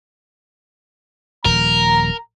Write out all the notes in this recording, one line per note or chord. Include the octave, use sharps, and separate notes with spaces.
D#1 F3 A#4 A#5